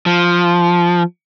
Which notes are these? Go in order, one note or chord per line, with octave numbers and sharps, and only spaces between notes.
F3